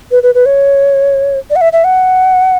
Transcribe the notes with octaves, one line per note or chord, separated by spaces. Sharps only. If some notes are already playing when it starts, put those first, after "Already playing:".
B4
B4
B4
C#5
D5
F#5
E5
E5
F#5